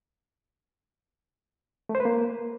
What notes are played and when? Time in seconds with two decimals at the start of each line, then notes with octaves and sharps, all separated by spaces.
1.89 A3
1.95 C5
2.00 B4
2.05 A#3